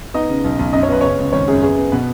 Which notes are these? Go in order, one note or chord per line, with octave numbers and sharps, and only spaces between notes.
B3 D#4 D#5
C#3
B1
B1
F#2 D#5
C#5
B3 B4
C#3 C#4 C#5
C#2
G#1 C#4 C#5
F#2 G#4
B3 G#4
B3
B2 B3 B4